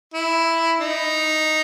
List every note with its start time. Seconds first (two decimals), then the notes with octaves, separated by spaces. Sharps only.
0.14 E4
0.80 D#4